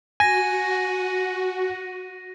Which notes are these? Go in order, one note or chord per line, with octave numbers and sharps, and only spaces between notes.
F#4 G#5 A#6 D#7